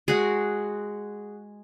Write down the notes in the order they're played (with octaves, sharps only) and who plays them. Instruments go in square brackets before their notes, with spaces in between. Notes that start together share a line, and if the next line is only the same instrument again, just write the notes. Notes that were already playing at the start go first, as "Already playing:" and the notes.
[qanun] G#3 F#4 G#4